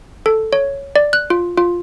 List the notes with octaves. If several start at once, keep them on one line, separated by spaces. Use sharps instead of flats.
A4
C#5
D5
F#6
F4
F4